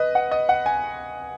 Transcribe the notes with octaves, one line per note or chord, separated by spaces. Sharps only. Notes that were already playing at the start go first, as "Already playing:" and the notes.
Already playing: B4 D#5
F#5
D#5
F#5
G#5